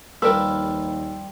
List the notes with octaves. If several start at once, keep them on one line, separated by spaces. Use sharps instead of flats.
D#2 F3 G3 A#4 B4 E6